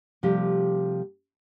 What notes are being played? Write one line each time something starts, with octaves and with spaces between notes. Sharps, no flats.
C3 F3 G3 A3 G4